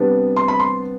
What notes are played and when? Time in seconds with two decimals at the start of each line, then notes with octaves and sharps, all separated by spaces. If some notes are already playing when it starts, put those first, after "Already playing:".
Already playing: C3 G3 B3 D4
0.36 C6
0.48 B5
0.60 C6